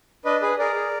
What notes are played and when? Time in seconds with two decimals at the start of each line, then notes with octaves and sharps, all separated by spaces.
0.25 D4 B4 D#5
0.42 G#4 B4
0.59 G#4 A#4 D5
0.75 G#4